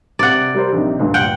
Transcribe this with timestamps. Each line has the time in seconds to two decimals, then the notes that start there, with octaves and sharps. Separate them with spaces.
0.19 C3 D5 F#5
0.55 G3 A#4 C5
0.72 A#1 C3 D#4
0.99 D2 G2 A#2
1.14 F#5 G5